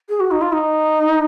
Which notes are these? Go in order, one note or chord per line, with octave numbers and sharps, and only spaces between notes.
G#4
F#4
D#4
F4
D#4